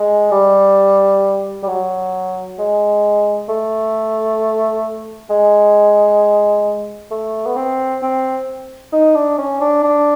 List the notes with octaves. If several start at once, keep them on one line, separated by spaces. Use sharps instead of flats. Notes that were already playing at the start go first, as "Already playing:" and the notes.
Already playing: G#3
G3
G3
F#3
G#3
A3
G#3
A3
B3
C4
C4
D#4
D4
C#4
D4
D4